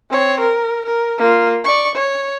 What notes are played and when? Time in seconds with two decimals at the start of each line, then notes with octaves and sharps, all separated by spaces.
0.10 C4 C#5
0.40 A#4
0.85 A#4
1.18 A#3 F4
1.65 D5 C#6
1.95 C#5